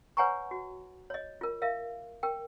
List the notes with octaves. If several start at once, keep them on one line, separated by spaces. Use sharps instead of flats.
B4 C#5 F#5 G#5 A#5 C#6
F#4
C#5 D#5
F4 A#4
A#4 E5 F5
A#4 G5